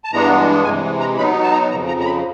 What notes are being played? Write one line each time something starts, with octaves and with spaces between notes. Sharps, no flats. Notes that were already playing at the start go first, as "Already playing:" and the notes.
A5
G2 E3 G#3 B3 D4 A#5
C3 E3 G#3 G#5
A#5
B2 F#3 B3 D#4 B5
A5
A#5
F2 C#3 F3 A#5
A#5
A#5
B5